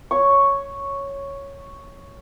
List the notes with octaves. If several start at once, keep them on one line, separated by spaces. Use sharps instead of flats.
C#5 C#6